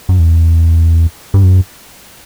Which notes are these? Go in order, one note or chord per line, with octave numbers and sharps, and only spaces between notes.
F#2
E2
G2
F#2